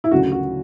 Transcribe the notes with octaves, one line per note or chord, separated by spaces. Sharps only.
E4
D2 C#3 F#3 F#4
F#4